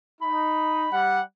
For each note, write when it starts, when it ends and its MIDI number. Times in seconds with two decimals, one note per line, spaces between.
0.22 0.87 63
0.22 0.99 83
0.93 1.21 55
0.93 1.21 78